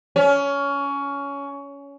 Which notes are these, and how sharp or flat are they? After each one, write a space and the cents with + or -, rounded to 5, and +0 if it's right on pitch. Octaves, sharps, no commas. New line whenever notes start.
C#4 +20